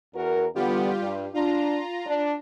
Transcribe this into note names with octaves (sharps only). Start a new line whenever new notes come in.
E2 F#4 A#4
E2 D3 G3 B3 F4 G4
G2
D4 F4 A#5
D4